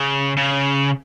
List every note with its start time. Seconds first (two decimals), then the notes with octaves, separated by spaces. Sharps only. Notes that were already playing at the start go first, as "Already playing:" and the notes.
Already playing: C#3
0.37 C#3